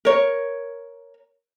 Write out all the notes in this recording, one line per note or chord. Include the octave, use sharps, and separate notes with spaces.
A#4 C#5